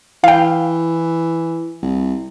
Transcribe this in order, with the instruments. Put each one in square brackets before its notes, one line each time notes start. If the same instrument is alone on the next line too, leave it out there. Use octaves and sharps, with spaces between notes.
[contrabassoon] E3 [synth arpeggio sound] F5 G5
[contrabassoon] C2